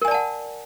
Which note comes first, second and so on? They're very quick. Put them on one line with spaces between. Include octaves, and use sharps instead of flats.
A#4 G#5 D5 A5 F#5